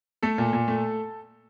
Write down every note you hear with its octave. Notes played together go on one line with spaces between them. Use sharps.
A3 A4
A#2
A#2
A3